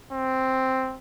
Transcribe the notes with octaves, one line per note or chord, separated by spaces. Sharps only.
C4